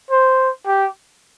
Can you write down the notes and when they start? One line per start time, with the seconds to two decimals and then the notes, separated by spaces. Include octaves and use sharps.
0.11 C5
0.67 G4